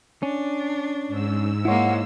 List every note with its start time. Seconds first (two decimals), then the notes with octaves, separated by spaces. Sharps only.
0.23 C#4 D4
1.08 G#2 E6
1.65 G#3 A#3 E4 C#5 F#5